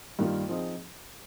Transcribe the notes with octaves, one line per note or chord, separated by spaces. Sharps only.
G2 D#3 G3 A#3 F4
F3 C4 D#4 G#4